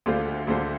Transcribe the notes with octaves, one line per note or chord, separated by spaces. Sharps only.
D2 D3 A3 F4 C5
D2 D3 A3 F4 C5